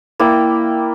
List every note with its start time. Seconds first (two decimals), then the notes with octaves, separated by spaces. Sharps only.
0.20 A#3 E4 D5 G5